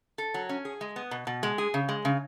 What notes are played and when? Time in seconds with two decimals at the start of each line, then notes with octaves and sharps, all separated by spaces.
0.18 A4
0.34 F#3
0.49 C#4
0.65 G#4
0.81 G#3
0.96 B3
1.11 B2
1.27 B2
1.43 G#3
1.58 G#4
1.74 C#3
1.89 G#3
2.05 C#3